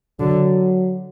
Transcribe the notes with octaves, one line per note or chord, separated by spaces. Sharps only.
D3 F#3